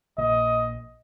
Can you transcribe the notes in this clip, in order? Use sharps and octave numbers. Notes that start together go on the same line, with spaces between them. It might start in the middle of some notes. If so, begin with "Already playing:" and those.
A#1 D#5